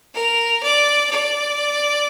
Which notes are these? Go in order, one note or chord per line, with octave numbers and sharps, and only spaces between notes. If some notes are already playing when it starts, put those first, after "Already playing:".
A#4
D5
D5